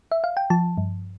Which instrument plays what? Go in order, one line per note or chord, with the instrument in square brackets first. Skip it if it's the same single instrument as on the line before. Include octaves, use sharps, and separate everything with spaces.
[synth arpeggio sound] E5
F5
G5
F3 A5
G2